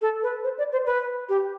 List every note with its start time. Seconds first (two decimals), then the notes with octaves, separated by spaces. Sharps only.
0.02 A4
0.23 B4
0.44 C5
0.58 D5
0.72 C5
0.86 B4
1.29 G4